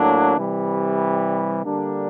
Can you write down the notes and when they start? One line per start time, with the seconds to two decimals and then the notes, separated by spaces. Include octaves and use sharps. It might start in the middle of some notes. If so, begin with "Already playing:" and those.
Already playing: A2 F#3 A#3 D4
0.36 C3 E3 G3
1.64 D3 G3 A#3 D4